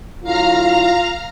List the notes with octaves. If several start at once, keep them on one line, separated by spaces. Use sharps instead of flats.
D3 F#3 E4 F4 F5 A#5 F6